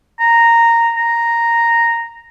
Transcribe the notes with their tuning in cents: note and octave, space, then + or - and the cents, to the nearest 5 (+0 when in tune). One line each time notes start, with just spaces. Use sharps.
A#5 -10
A#5 -5